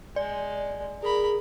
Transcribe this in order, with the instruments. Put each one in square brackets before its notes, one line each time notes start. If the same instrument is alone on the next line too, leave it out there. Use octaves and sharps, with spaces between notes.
[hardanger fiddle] G#3 [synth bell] D5
[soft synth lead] G#4 [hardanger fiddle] A#4 B5